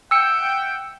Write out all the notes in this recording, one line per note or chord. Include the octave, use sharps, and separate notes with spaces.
E5 F#5 G5 E6 C#7